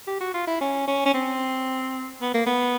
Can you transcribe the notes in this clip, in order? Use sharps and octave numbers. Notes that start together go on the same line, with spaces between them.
G4
F#4
F4
E4
C#4
C#4
C#4
C4
B3
A#3
B3